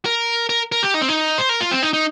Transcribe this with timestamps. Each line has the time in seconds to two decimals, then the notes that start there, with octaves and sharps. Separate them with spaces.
0.05 A#4
0.49 A#4
0.72 A#4
0.83 G4
0.94 D#4
1.02 C4
1.09 D#4
1.38 C5
1.49 A#4
1.61 F4
1.71 C4
1.83 D#4
1.93 D#4